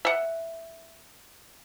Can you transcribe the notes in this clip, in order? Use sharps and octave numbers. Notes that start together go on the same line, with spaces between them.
E5 F#5